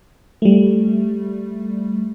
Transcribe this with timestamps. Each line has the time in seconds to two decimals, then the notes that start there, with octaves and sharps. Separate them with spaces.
0.42 G3 A3